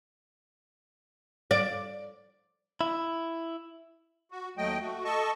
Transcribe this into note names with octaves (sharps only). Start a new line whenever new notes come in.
D5
E4
F#4
D#2 F#3 A3 D#5 G5
A3 F#4
A4 D#5 A5 C#6